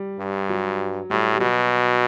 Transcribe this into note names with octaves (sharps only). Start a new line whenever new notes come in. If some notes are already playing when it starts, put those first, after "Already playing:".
Already playing: G3
G2
F#3
A2 G3
G3
B2 F#3